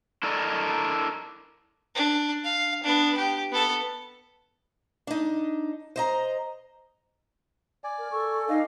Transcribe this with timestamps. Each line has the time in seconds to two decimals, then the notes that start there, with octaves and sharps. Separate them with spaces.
0.23 D4 E4 A4 A#4 D5 D#5
1.95 D4
2.44 F5
2.83 B3 D4
3.17 G4
3.52 B3 A4
5.07 D4 D#4
5.96 C5 D#5 A#5
7.84 D5 G#5
7.98 A#4
8.12 A4 C#6
8.49 D#4 D#5 F5